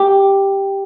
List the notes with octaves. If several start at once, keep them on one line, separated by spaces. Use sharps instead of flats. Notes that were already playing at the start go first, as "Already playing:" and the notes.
Already playing: G4